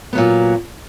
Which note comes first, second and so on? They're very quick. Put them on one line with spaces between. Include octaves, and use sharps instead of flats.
B3 F#3 A#2